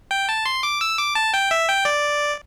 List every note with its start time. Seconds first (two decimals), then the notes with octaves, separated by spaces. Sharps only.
0.11 G5
0.29 A5
0.46 C6
0.63 D6
0.81 E6
0.98 D6
1.15 A5
1.34 G5
1.51 E5
1.68 G5
1.85 D5